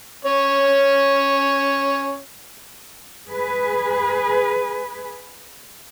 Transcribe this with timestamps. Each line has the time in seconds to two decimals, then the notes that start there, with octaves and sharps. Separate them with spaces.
0.25 C#4 C#5
3.27 G#4 B4